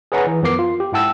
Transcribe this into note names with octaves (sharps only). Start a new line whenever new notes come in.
G#4 B4 C#5 F#5 G#5 A#5
E3
F#2 F3 B3 A#4 D6 C7
F4
G4
G#2 E4 F#5 G5 A5 E6